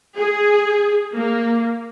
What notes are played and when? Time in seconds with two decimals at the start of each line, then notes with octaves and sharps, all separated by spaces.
0.17 G#4
1.14 A#3